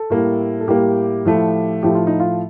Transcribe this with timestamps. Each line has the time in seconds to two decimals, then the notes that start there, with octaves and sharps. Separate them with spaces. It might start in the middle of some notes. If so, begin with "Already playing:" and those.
Already playing: A4
0.10 A2 G3 A#3
0.60 A4
0.68 A2 G3 A#3 G4
1.25 A2 F3 A3
1.83 A2 F3 A3 G4
1.95 F4
2.07 D#4
2.20 F4